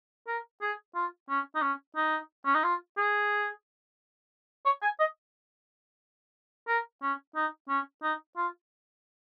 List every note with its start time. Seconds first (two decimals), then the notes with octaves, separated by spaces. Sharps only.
0.27 A#4
0.61 G#4
0.95 F4
1.29 C#4
1.55 D#4
1.62 C#4
1.96 D#4
2.45 C#4
2.55 D#4
2.63 F4
2.97 G#4
4.65 C#5
4.82 G#5
4.99 D#5
6.67 A#4
7.02 C#4
7.35 D#4
7.69 C#4
8.02 D#4
8.36 F4